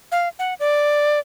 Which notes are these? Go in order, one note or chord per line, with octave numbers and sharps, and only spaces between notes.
F5
F#5
D5